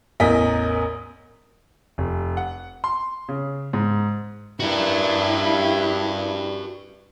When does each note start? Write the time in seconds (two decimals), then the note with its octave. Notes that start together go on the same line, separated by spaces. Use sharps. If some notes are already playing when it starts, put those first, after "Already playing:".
0.20 A1 E2 A#4 D#5 B6
1.98 F1
2.37 F#5
2.84 C6
3.29 C#3
3.73 G#2
4.60 G2 E4 F#4 A#4